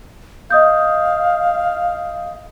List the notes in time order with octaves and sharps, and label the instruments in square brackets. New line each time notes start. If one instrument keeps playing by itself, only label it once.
[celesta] D#5 D#6 G6 [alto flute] F5